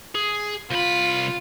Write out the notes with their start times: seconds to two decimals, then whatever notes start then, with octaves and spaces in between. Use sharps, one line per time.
0.15 G#4
0.70 C2 F4 B5